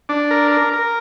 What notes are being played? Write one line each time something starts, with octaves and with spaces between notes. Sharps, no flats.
D4
A#4
A#4
A#4